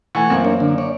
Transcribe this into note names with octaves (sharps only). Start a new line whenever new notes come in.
E3 A3 F#5 G#5 C#6
F#2 A#3 C4
D4 A#4 C#5
D3 D4
C#5 D5